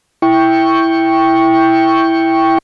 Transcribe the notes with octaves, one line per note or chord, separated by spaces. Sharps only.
E4 G5 C#6